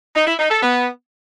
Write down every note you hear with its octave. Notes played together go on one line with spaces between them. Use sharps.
D#4
E4
D#4
A4
B3